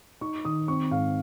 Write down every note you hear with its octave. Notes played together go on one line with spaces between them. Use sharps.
D#4 C#6
D#3 D#6
C4 C#6
G#2 F5